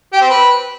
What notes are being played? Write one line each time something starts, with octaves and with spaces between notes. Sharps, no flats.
G4
C4
B4